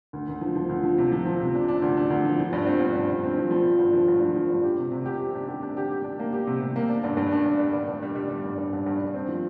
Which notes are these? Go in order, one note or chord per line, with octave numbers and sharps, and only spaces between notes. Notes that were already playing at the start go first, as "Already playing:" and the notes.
D2
D2
F3
F3
D2
F3
C3
F3
F3
C3
D4
D4
D2
D4
D2
F3
F3
G2
C4
G2
G2
G2
C4
F3
F3
C4
G2
F3
G2
F3
F3
G2
G4
C3
C3
G4
G4
D4
G4
D4
G4
G4
D4
A#3
G4
C3
C3
A#3
D4
G2
G2
D4
G2
G3
G2
G2
G3
G3
G3
G2
G2
G2
G2
G2
C4
F3